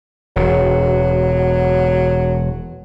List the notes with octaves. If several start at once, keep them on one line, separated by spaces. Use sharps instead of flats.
E1 F#3